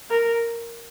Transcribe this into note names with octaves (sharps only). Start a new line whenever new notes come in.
A#4